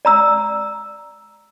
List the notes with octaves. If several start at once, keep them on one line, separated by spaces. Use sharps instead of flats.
D5 A#5 E6